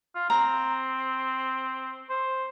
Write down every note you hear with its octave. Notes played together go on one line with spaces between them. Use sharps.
F4
C4 A#5
C5